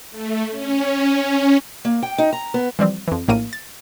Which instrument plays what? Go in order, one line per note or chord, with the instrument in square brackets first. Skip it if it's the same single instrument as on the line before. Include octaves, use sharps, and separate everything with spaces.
[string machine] A3
C#4
[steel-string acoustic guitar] A#3
G5
D#4
A#5
B3
[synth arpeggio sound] E3 F3 G3 C4
F2 E3
A#1 A2 A#3 A#4 D#7
A6